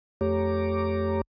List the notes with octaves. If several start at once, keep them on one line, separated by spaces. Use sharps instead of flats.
F2 A3 G4 C#5 A#5 D6